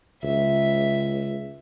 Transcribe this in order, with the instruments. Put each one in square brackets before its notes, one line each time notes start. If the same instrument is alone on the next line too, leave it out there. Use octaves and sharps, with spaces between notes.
[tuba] C#2 [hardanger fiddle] E5